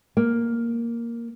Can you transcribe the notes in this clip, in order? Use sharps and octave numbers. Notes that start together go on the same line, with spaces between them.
A#3